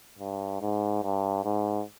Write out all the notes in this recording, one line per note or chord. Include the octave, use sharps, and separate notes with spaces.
G2
G#2
G2
G#2